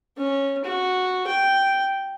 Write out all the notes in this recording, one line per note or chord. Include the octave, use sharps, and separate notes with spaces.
C#4
F#4
G5